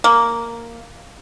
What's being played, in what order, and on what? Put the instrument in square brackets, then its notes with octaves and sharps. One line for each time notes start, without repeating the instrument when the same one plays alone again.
[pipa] A#3